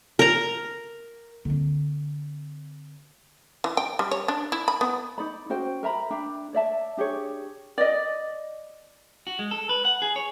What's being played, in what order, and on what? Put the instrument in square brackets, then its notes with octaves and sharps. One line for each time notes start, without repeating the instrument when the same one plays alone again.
[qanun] A#4 A#5
[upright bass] D3 C4
[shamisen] E3
G5
G3
C#5
D4
E4
B5
B3
[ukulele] D#4 D5 B5
C#4 F#4 C5 G5
A#4 E5 A#5 B5
D4 E5 G5 B5
C#5 D5 E5 A5
D4 G4 G#4 C#5
D5 D#5
[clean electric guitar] F#4
G#3
A4
B4
F#5
G#4
C#5